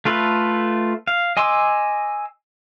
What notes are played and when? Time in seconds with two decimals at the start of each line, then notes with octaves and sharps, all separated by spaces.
0.05 A3 F4 A4 B4
1.07 F5
1.37 D#5 G#5 C6 D6 E6